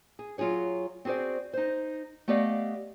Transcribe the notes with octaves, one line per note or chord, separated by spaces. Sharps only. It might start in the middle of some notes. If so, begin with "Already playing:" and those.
G#4
F#3 F4 F#4 G#4 C#5
C4 F#4 G#4 C5 D5
D#4 C5
A3 B3 G4 D5 D#5 F5